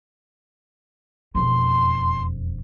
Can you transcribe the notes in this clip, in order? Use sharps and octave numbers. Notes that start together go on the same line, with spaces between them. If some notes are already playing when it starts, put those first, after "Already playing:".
E1 F2 C6